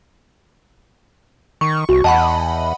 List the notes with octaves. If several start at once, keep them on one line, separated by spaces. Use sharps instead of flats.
D#3 C#6
C2 F#4
E2 D#5 F#5 A5 B5